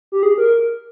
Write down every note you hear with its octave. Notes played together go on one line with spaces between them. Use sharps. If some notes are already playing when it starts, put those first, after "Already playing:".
G4
G#4
A#4